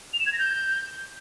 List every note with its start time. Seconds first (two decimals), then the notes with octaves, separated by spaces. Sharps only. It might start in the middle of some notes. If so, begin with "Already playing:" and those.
0.13 F7
0.20 E7
0.26 G#6
0.33 A#6
0.39 G6